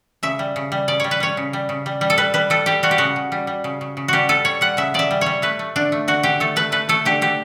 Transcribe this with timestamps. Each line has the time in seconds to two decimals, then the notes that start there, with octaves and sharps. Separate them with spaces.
0.23 C#3 E5
0.39 G3
0.56 C#3
0.72 G3
0.88 C#3 D5
1.00 G3 C#5
1.11 B4
1.20 G3 C#5
1.37 C#3
1.53 G3
1.69 C#3
1.86 G3
2.01 G3
2.10 A4
2.18 G3 B4
2.34 G3 B4
2.50 G3 A4
2.66 G3 G4
2.83 G3 F#4
2.91 G4
2.98 C#3 F#4
3.16 C#3
3.32 G3
3.47 G3
3.64 C#3
3.81 C#3
3.97 C#3
4.08 G3 F#4 G4
4.29 G3 A4
4.45 G3 C#5
4.61 G3 F#5
4.77 C#3 E5
4.94 C#3 D5 E5
5.11 G3
5.21 G3 C#5
5.42 A3 B4
5.59 A3
5.76 D3 D4
5.92 A3
6.08 D3 F#4
6.23 D3 G4
6.40 A3 A4
6.56 A3 B4
6.72 A3 B4
6.89 A3 A4
7.05 D3 G4
7.21 D3 G4